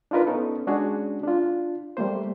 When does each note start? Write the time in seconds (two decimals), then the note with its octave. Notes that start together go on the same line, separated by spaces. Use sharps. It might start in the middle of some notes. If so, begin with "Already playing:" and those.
0.11 D4 D#4 F4 A#4 B4
0.27 B3 C#4 D#4 A4
0.67 G#3 C#4 D4 F#4 G#4
1.23 D4 F4
1.97 G3 A3 A#3 C5